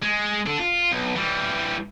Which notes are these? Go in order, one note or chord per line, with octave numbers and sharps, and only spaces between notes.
G#3
D4 A4
F4
B1
E3 G3